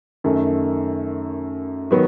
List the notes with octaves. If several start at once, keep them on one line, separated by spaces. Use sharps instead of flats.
F#2 D#3 A3
D#3 F#3 B3